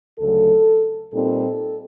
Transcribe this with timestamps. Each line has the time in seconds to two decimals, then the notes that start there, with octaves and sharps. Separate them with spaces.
0.19 D2 C#3 F#3 A3 A4
1.14 A#2 G3 C4 D#4 A4